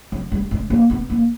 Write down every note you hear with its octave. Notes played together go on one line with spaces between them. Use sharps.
F#3
G3
G#3
A#3
B3
A#3